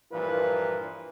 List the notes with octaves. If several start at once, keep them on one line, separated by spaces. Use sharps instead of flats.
G2 A#2 E3 F3 A#4 B4